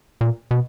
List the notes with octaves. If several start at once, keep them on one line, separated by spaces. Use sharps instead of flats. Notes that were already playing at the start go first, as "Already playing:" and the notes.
A#2
B2